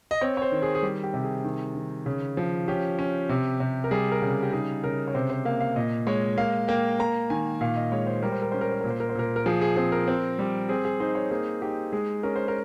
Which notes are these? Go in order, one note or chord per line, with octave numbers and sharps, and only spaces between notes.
D#5
C4 C#5
C#5
C5
D#3
G#4
G#4
G3 G4
G4
C3
G#4
D#3
D#3
C#3
F3
C#4 G4
C#4
C3
C3
A#4
G3 G#4
A#4
C#3
G4
G4
D#4 G#4
C#3 A#4
C#5
C3 C5
C5
A#3 F5
F5
A#2 D#5
G#3 C#5
A#3 F5
A#3 G5
A#3 A#5
D#3 G#5
A#2 F5
D#5
G#3 C#5
C5
G3 A#4
C5
A#4
C#4 C5
A#4
C5
A#2 A#4
C5
A#4
C5
A#2 A#4
A#4
F3 G#4
G#4
C4 G#4
A#4
C4
G3
C4 G#4
G#4
D#4 C5
C#5
A#3 G#4
D#4 G4
G#3 G#4
C#4 A#4
C5
A#4